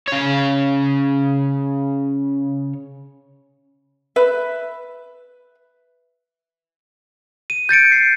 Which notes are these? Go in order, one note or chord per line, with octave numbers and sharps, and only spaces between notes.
C#3 C#5
B4 E5
D#7
G6 A6 C#7 D7
C7